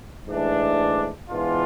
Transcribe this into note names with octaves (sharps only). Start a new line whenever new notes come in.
G#2 E3 A3 D4
G#2 E3 B3 D4 F4